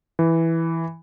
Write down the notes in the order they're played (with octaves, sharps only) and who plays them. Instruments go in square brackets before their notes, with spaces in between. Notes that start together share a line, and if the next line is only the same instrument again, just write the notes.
[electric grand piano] E3